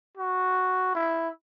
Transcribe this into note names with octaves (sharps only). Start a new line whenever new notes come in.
F#4
E4